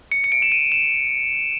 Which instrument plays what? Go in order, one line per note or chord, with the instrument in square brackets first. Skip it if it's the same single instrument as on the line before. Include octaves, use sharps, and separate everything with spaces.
[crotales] C#7
C#7
D7
E7
D#7
E7